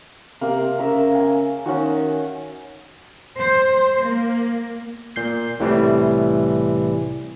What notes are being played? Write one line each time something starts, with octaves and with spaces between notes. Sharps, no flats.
C3 A#3
C#3 A#4 E5
G#5
D#3 C#4 F#4
C5
A#3
A#2 G6 C7
C2 A2 C3 E3 G3